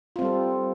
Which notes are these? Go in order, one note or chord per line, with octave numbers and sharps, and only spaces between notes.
G3 C4 F4 A4